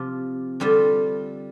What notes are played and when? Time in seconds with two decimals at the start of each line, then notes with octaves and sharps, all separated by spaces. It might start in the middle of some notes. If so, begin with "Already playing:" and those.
Already playing: C3 F3 C4 F4
0.60 D3 G3 C4 F4